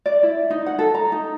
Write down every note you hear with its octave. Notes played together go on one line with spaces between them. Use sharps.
D5
E4
D#4
F#5
A4
A#5
D#4